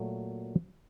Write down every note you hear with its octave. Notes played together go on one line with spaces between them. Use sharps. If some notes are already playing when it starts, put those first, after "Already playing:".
Already playing: A#2 F#3 A3